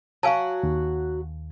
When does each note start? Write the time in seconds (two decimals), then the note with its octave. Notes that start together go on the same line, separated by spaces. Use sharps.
0.23 F#3 F#4 F5 G#5 A5
0.63 D#2